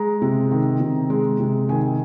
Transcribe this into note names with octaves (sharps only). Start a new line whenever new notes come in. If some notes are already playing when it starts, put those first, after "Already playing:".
Already playing: G#3 A#5
C3
D#3
C3
G#3
C3
D#3 G#5